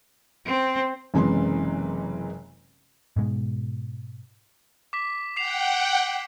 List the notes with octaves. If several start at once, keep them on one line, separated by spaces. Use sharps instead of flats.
C4
F#1 C3 E3 G#3 C#4 C6
G#2 B2 G#3
D6 B6
F#5 G5 D6 C7 F7